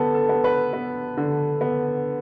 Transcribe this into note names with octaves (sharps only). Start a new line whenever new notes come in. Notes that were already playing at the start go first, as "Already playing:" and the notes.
Already playing: D3 B3 A4
A4
B3
B4
B3
D3
B3